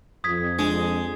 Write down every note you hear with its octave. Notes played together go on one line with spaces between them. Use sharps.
F2 D#6 G#6 B6
G#3 D4